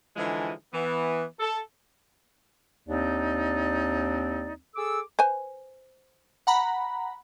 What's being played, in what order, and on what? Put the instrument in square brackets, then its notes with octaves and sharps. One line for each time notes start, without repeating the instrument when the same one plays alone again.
[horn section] D3 E3 F3 G#3 D#4 G#4
E3 B3
A4
[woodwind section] D#2 C4 D4 D#4 D5
G#4 A4 D6 E6
[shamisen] B4 C5 G#5
[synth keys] F#5 A#5 B5